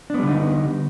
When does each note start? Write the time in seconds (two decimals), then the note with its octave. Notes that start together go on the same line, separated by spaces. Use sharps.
0.10 D4
0.14 B3
0.19 G3
0.23 D3
0.27 D#4